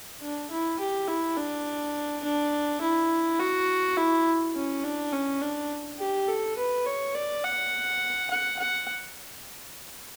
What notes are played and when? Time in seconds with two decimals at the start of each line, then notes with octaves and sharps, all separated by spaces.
0.22 D4
0.51 E4
0.80 G4
1.08 E4
1.37 D4
2.24 D4
2.81 E4
3.39 F#4
3.97 E4
4.55 C#4
4.83 D4
5.13 C#4
5.41 D4
5.99 G4
6.28 A4
6.57 B4
6.86 C#5
7.15 D5
7.44 F#5
8.30 F#5
8.59 F#5